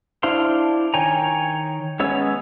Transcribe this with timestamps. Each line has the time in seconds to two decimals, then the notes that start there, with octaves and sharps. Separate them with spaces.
0.23 D4 E4 C5 F5 C6
0.94 D#3 C#5 G5 G#5 A#5
2.00 G#3 B3 C#4 C#5 E6